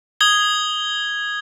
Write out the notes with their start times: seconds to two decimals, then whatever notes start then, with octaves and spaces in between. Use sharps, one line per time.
0.21 D#6 G#6 G7